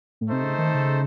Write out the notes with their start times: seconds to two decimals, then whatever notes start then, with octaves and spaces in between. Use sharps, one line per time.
0.21 A2
0.28 C3 A3 D#4 A4 C5
0.43 C#3
0.58 D#3
0.74 C#3